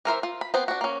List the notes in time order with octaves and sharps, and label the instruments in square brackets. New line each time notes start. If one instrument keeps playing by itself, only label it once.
[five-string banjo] E3 A#4 C5 E5
F4
B5
B3 C4 C5
D4 F#4
A#3 C#4